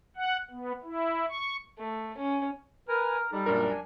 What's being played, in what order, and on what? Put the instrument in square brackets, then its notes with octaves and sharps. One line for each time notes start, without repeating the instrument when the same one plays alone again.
[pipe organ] F#5
B3
E4
C#6
[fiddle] A3
C#4
[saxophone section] A#4 [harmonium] B4 G#5
[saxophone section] G3 [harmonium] D#4 A4
[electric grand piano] F#2 D4 A#4 [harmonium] A#2
[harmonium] D4 G#5